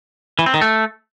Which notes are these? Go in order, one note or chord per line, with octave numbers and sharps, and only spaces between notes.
E3
C4
D#3
A3